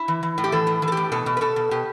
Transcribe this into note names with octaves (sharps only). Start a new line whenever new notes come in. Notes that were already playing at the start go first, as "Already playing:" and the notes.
Already playing: E4
E3
E3
A2
G4
E3 A4
A2
E3
A4
G4
A2
B2 A4
B2
B4
B2 A4
B2
B2 G4